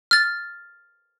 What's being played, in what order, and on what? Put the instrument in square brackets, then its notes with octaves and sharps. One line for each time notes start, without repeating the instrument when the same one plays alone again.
[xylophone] F6 A6